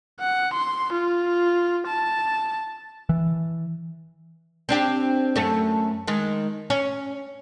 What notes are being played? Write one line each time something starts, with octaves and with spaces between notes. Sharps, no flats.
F#5
C6
F4
A5
E3
C4 D4 G4
F#2 A3
D#3 G#3
C#4